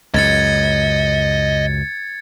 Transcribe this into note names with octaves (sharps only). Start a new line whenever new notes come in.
C#2 F#2 D#5 G#6 A6 C#7